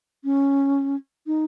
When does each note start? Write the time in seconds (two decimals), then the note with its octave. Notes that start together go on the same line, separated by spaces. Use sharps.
0.24 C#4
1.27 D#4